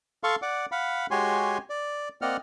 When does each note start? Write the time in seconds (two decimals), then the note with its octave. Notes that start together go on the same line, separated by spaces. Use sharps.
0.24 A4 F5 C6 C#6
0.42 D5 F#5 D6
0.72 F5 F#5 B5
1.11 G#3 F#4 G4 C#5 G#5 C6
1.70 D5
2.22 A#3 C4 D5 D#5 F#5 F6